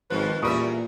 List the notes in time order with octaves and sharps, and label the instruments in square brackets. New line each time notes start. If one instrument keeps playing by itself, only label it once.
[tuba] G#1 [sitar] D#3 F3 [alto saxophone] B4
[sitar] E2 A#4 E5 [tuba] A#2 [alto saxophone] G3 [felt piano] B5 C#6 D#6